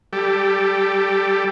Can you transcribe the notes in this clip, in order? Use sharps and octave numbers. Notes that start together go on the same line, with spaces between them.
G3 G4 A4